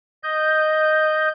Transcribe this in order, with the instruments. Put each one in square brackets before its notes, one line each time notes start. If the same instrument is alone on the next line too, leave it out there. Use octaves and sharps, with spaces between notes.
[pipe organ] D#5 G6